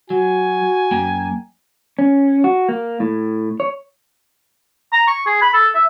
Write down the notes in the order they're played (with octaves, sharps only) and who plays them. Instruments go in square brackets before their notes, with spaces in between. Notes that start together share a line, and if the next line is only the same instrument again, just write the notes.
[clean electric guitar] F#3 [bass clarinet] F#4 [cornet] G#5
[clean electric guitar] F#2 A#3 G5
[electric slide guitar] C#4
F#4
A#3
A2
C#5
[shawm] A#5
C#6
G#4
B5
A4
E5